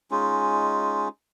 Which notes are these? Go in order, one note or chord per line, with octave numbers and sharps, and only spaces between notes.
G#3 C#4 D#4 F4